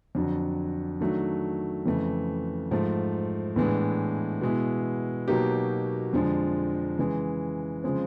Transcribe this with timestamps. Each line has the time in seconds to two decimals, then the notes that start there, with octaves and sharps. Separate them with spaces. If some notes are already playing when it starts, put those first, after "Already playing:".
0.15 F2 D3 F#3
1.01 D#3 F#3 A3 D4
1.86 F2 C#3 E3 A3
2.71 G#2 F3 A3
3.56 A2 E3 G#3 B3 D4
4.41 B2 G#3 B3 E4
5.28 B2 F#3 A#3 D#4 G4
6.13 F2 D3 F3 G#3
6.98 C#3 E3 G#3
7.84 C#3 F3 G#3 C4